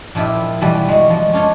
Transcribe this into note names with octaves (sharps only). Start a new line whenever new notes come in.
A#2 F3 E4 F4 G4
B2 E3 F3 G3 B4
G#3 F#4
F3
C#4 D4 F4 C#5 D#5